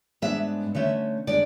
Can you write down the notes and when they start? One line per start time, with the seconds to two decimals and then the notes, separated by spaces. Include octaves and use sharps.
0.22 G#2 G#3 B3 D4 E5
0.75 D3 A3 C#4 E5
1.27 D3 G#3 D4 D5